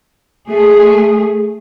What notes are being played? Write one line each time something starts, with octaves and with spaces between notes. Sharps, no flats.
A3 G#4